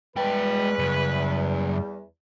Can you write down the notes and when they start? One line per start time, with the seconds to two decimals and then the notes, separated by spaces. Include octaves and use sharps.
0.16 E2 G3 G#3 B4 G5
0.79 F#2 C#3